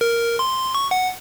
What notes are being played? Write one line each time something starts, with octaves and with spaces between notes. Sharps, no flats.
A#4
C6
C#6
F#5